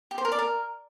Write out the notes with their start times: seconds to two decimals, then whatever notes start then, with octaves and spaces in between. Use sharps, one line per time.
0.11 G4
0.18 C5
0.25 A#4
0.32 D5
0.39 A#4